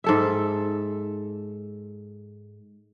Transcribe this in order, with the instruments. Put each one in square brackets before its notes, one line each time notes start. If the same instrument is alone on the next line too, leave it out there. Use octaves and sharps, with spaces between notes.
[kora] G#2 A4 E5